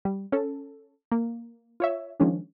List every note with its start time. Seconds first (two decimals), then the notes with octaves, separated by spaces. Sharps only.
0.05 G3
0.32 C#4 A4
1.12 A#3
1.80 F4 C#5 E5
2.20 D#3 F3 G#3 C#4 D4